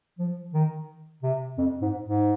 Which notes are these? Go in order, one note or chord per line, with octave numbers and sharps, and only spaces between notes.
F3
D#3
C3
F2
G#2
G#2